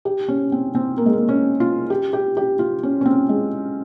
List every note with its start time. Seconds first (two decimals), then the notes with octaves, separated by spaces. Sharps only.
0.05 G4
0.28 C#4
0.52 C4
0.75 C4
0.98 A#3
1.06 G#3
1.13 A#3
1.29 C#4
1.60 F4
1.90 G4
2.13 G4
2.37 G4
2.59 F4
2.83 C#4
3.01 C#4
3.06 C4
3.29 G#3